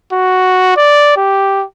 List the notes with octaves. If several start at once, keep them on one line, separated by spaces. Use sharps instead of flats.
F#4
D5
G4